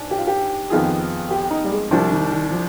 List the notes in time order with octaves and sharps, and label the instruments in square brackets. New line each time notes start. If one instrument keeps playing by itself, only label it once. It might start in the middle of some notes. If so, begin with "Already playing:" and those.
Already playing: [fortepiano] G#2 D4
[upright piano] G4
F4
G4
[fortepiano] F2 D#3 B3 F4 G#4
[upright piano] G4
D#4
G3
G#3
[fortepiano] C2 C3 G3 D4 [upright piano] F3
[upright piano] D#3
D#3
F3